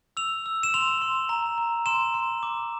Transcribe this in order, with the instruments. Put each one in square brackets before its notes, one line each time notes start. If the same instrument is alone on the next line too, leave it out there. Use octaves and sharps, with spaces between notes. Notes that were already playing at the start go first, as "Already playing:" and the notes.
[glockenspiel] E6 F7
E6
E7
C6 F7
C6
A#5
A#5
C6 E7
C6
D6